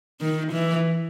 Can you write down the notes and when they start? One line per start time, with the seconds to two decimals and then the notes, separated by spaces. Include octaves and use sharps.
0.21 D#3
0.52 E3